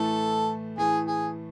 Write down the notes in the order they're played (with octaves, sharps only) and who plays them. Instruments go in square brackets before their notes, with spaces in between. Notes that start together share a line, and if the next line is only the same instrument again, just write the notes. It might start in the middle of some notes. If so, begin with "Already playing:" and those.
Already playing: [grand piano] A2 E3 A3 [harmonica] A4
[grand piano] A2 E3 A3 [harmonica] G#4
[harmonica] G#4